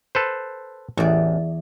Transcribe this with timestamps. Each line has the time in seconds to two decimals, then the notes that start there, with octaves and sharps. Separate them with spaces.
0.15 A4 B4 C5
0.97 A1 E2 D5